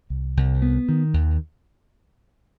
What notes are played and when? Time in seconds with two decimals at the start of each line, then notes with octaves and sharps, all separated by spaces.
0.10 C2
0.37 C2
0.62 B3
0.89 D#3
1.14 D#2